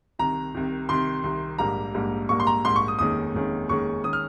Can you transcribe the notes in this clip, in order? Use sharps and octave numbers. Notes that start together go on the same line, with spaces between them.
C2 C3 D#3 A#5
C2 C3 D#3
C2 C3 D#3 C6
C2 C3 D#3
A#1 G#2 G3 A#3 A#5
A#1 G#2 G3 A#3
A#1 G#2 G3 A#3 C#6
C6
A#5
A#1 G#2 G3 A#3 C6
C#6
D#6
F1 D#2 D#3 G#3 C#4 D#6
F1 D#2 D#3 G#3 C#4
F1 D#2 D#3 G#3 C#4 C#6
D#3 G#3 C#4 D#6
F6